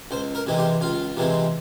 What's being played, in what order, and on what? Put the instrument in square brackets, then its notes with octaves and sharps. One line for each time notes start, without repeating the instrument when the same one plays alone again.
[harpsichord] C#2 C5
A#4
C3 E3 G#3 C4
G4
C#2 F4
C3 E3 G#3 C4